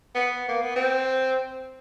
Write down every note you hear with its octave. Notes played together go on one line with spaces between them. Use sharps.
B3
A#3
B3
C4